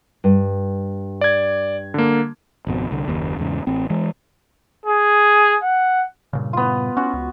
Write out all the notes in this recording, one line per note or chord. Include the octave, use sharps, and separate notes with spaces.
G2
D5 G#6
D3 A#3
G#1 F2 B2
C2 D3
F#1 D#2
E2 G#2 C#3
A1 C4
E3 G#3
G#4
F#5
G2 A#2 C#3
B3 F4
C#4 F#4
C#2